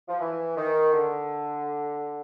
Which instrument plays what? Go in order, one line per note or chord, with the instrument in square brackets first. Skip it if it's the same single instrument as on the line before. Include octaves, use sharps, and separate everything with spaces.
[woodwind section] F3
E3
D#3
D3